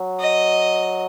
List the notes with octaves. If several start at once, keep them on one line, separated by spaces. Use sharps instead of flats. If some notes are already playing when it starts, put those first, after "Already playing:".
Already playing: F#3
D#5